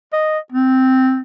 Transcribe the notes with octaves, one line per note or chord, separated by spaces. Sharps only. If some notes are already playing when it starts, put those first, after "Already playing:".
D#5
C4